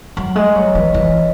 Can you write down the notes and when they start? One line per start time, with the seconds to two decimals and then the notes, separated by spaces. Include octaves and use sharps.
0.16 F#3 F#5
0.36 G#3 D#5
0.56 F#3 C#5
0.75 E3 B4
0.94 E3 B4